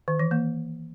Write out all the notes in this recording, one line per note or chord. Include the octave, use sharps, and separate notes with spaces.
D#3
E3
A#3